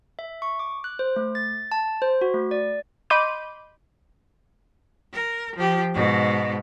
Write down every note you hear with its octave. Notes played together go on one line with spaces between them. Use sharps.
E5
C#6
D6
F#6
C5
A3
A6
A5
C5
F#4
A3
D5
D#5 B5 C6 D6 G6 D#7
A#4
F3 G4
G#2 B2